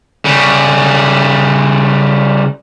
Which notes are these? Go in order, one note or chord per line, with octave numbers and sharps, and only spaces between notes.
C#3 G3